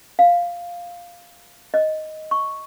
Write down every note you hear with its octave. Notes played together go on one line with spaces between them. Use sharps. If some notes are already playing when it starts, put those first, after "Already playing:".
F5
D#5
C#6